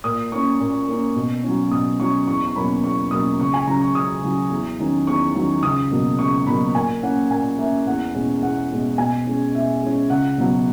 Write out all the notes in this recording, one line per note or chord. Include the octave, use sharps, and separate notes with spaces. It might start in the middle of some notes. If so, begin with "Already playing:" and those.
A#2 D#6
A#3 C#4 C#6
A#2
A#3 C#4
B2
F#3 C#4
B2 D#6
F#3 C#4 C#6
E2 C#6
C#6
B2 F#3 A#3 C#4 B5
E2 C#6
B2 F#3 A#3 C#4 D#6
C#2 C#6
G#5
C#3 F#3 A#5
C#6
C#2 D#6
C#3 F#3
E2
D#3 F#3 C#4
E2 C#6
D#3 F#3 C#4
C#2 D#6
B2 F#3 A#3
C#2 C#6
B2 F#3 A#3 B5
A#2 G#5
A#3 C#4 F#5
A#2 G#5
A#3 C#4 E5
E2 F#5
B2 G#3 C#4
E2 F#5
B2 G#3 C#4
B2 G#5
G#3 C#4
B2 E5
G#3 C#4
C#2 F#5
B2 F#3 B3